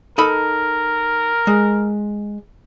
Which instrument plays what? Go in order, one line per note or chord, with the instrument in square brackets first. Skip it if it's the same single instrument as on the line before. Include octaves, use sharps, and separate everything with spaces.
[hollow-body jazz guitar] D#4 A4 B5 [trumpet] A#4
[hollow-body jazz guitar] G#3